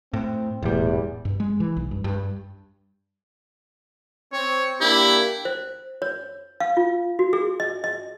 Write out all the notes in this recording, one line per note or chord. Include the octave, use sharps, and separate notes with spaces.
A2 C4
E1 E2 A2 G3
G2
G#3
E3
B1
G2
G2
C4 C#5
A#3 D4 E4 G4
C5
C#5
F5
F4
F#4
G#4
D#5
D#5